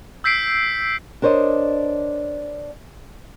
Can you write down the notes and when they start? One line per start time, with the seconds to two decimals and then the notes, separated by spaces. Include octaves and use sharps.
0.24 E6 G6 B6 C7 D7
1.22 D4 A#4 C5 C#5 D#5